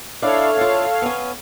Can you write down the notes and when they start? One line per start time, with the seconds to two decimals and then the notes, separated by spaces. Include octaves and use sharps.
0.22 D4 E4 A4 C#5 F5
0.57 D4 F4
1.02 B3 C#4